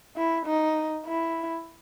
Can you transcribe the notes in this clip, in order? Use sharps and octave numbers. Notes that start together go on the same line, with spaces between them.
E4
D#4
E4